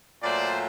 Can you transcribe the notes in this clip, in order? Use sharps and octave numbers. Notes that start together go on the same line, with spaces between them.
A#2 F#3 A3 C5 D5